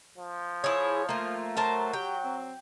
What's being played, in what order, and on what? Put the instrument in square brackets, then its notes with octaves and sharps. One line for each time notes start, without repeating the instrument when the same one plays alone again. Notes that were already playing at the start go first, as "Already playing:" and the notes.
[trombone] F3
[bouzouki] E4 G#4 [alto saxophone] C#5
[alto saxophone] A3 [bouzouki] A#3 F4
[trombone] F#3 [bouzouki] A#4 C5 A5
[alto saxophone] G4 [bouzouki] G5
[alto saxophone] C4